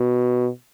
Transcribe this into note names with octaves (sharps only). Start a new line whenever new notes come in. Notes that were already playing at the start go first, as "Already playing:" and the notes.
Already playing: B2